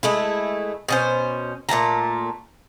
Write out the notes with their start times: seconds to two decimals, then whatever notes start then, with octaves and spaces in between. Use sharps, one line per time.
0.03 G#3 A3 E4
0.89 B2 C#4 C5
1.69 A#2 A3 A5 A#5